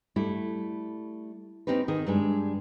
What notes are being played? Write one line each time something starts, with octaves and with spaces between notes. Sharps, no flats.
G3 A3 E4
C4 C#4 D#4 G4 B4
D#3 G#4
G2 G3 G#3